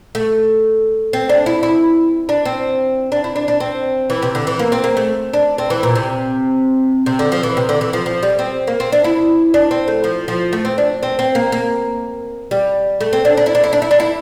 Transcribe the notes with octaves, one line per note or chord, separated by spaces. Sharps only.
A3
C4
D4
E4
E4
D4
C4
D4
E4
D4
D4
C4
E3
C3
D3
E3
A#3
C4
A#3
A3
D4
C4
E3
A#2
C3
C3
D3
F3
E3
C3
D3
E3
F3
F3
G3
C4
A#3
C4
D4
E4
D4
C4
A3
F3
F3
A3
C4
D4
C4
C4
A#3
A#3
G3
A3
C4
D4
D4
E4
D4
E4
D4
E4
D4
E4